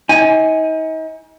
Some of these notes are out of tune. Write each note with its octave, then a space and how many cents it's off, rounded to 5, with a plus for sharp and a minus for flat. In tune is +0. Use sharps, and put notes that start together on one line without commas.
D#4 +40 G#5 +0